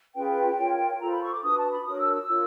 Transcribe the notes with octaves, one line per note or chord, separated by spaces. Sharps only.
C#4 F4 G#4 B4 G5
F4 A#4 C#5
F4 A4 C5 A#5
B5
C#6
D6
D4 F#4 B4 D#6
A5
B5
D4 F#4 A#4 C#5 D#6
E6
E6
F4 A#4 C#5